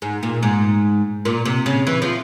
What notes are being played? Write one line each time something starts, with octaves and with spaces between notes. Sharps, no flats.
G#2
A#2
G#2
A#2
C3
C#3
E3
F3